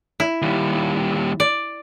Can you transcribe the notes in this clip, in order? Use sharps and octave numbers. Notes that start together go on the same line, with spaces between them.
E4
D#2 G3
D5